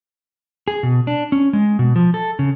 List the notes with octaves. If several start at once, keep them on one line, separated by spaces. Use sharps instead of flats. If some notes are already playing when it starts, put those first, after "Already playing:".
G#4
B2
D4
C#4
G#3
B2
F3
A4
C#3